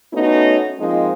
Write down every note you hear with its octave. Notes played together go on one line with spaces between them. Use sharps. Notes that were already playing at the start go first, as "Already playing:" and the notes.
A3 B3 C#4 D#4 F#4
F3 G#3 A#3 C4 D#4 F4